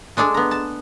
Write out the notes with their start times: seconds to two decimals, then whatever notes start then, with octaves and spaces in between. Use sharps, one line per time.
0.17 G#3 D4 G#4 A4
0.34 B3 A#5
0.51 A5